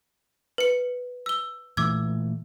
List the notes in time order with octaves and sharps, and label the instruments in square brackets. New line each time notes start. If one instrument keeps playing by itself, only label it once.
[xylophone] B4 C#7
E6 G7
[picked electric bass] A#2 E3 A3 [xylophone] D6 E6 G#6